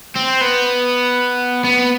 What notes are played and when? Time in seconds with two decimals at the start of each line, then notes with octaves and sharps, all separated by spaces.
0.16 C4
0.41 B3
1.65 B3